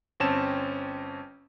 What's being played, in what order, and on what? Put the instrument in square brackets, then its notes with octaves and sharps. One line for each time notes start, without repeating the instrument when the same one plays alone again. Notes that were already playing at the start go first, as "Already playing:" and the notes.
[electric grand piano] G1 C4 C#4 A5 E7